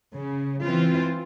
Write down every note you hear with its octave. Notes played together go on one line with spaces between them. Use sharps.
C#3
E3 C4 F4